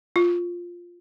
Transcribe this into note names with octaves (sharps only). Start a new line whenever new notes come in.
F4